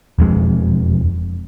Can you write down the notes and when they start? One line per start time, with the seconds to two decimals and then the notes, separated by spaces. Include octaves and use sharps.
0.19 E1 F2 G#3